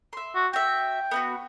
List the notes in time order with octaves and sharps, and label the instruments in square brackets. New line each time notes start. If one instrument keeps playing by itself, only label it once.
[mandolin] E5 C6
[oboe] F#4
[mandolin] F#4 E5 [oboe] G5
[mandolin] B3 D#4 F#4